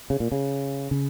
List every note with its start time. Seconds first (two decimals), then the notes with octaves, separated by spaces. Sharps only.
0.10 C#3
0.20 A#2
0.32 C#3
0.91 C#3